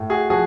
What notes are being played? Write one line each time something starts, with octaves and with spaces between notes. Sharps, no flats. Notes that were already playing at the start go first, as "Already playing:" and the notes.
Already playing: A2
F#4 G#4
F3 F#4 G#4